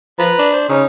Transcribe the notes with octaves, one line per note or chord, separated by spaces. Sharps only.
F3 B4 A#5 B5
D4
C5
C#3 C#4 D#4